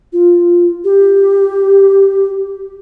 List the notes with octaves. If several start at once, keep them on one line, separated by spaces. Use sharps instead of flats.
F4
G4